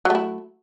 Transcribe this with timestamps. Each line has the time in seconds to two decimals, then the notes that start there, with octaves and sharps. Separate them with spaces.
0.05 F#3
0.10 A3
0.15 E4